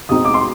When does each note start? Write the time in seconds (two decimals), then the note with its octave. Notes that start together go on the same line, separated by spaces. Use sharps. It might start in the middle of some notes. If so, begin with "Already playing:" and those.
0.09 B2 G#3 C4 D#4 D#6
0.25 D6
0.34 C6